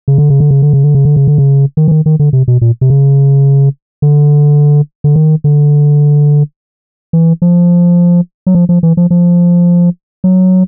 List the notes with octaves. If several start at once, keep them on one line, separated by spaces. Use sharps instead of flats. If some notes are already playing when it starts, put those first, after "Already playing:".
C#3
D3
C#3
D3
C#3
D3
C#3
D3
C#3
D3
C#3
D3
C#3
D#3
E3
D#3
D#3
D3
C3
B2
A#2
C3
C#3
D3
D3
D#3
D3
E3
F3
F#3
F3
F3
E3
F3
F3
F#3